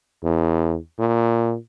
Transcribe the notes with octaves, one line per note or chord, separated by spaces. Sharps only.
E2
A#2